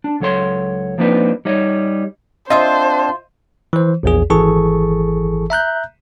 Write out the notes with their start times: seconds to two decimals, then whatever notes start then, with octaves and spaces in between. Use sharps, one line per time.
0.04 D4
0.20 C#2 F#3 A4 C#5 C6
0.98 F3 A#3 C4 D4 D#4 B4
1.45 G3 D#4 C#5 D#5
2.50 C4 D4 F4 C5 D#5 E5 A5 C6
3.73 E3 C5
4.03 A#1 E2 G#4
4.30 G#1 E3 G#4 A4 A5 C#6
5.50 E5 A#5 F#6 G6